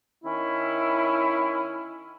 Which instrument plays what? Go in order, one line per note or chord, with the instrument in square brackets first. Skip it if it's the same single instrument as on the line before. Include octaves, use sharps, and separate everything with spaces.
[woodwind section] D#3 C#4 E4